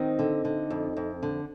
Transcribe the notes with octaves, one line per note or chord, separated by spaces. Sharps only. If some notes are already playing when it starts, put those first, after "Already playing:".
Already playing: D#3 C4 D#4
D3
D3
F2
F2
D3